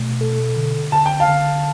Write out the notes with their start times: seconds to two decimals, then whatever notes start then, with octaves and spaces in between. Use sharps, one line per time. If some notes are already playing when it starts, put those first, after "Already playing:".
Already playing: B2 A3
0.21 A4
0.56 D3
0.92 D3 A5
1.06 G5
1.20 F5 A5
1.28 D3